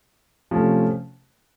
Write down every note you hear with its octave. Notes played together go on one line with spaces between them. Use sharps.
C3 F3 A3 C#4